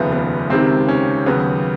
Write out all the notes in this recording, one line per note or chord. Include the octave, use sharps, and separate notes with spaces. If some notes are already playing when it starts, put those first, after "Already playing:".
Already playing: F1 D#2 C#3 F3 B3
B3
C#2 C3 D#3 C4
C#4
D#2 C#3 F#3 B3